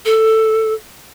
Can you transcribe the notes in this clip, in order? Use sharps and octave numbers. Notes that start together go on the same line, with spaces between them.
A4